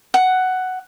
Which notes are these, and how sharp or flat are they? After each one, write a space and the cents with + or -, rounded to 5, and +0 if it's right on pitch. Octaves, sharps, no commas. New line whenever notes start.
F#5 +5